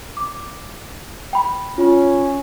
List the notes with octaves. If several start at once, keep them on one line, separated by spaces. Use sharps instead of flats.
D6
G5 B5
C#4 F4